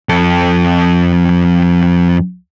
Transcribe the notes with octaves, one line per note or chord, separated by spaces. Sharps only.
F2 A4